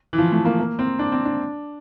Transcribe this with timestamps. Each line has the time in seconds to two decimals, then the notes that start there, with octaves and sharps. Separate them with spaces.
0.13 E3
0.18 F3
0.32 A3
0.45 A#3
0.59 A#3
0.79 C4
0.99 D4
1.12 C4
1.25 D4